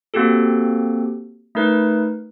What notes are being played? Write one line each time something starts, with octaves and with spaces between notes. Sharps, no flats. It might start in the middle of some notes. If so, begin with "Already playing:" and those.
A#3 C4 F#4 G4 A4
A3 D#4 A#4 B4